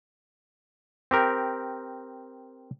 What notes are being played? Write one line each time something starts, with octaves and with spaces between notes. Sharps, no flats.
C4 G4 A#4